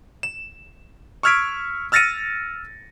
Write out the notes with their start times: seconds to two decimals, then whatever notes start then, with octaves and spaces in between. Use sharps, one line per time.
0.23 E7
1.23 C#6 E6 F6 G#6 B6 D7
1.92 E6 F6 A6 A#6 C#7 D#7